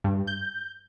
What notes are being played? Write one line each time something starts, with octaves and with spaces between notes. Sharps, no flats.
G2
G6